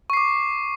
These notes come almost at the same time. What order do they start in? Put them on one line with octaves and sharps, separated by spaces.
C#6 C7 D6